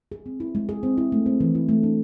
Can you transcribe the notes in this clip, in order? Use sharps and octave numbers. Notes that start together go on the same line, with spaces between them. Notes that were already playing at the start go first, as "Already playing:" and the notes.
G#4
C4
E4
G#3
G#4
C4
E4
A3
C4
E3
E4
A3
D4